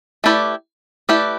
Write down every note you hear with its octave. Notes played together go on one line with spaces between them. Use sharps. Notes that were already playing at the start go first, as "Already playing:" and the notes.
A3 E4 G4 B4 D5
A3 E4 G4 B4 D5